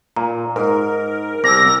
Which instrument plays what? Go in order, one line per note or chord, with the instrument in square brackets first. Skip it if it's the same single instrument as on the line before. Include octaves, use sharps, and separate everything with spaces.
[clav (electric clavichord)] A#2 [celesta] A#5
[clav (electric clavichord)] G#2 [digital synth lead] A#4
[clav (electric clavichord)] C2 [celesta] D6 E6 [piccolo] A#6